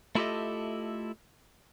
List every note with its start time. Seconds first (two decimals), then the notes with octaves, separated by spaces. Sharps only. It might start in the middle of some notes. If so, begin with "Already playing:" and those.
0.15 A3 E4 F4 G4 A4 D#5